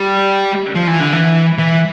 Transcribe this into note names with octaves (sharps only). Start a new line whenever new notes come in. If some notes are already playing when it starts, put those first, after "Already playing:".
Already playing: G3
F3
E3
D3
E3
E3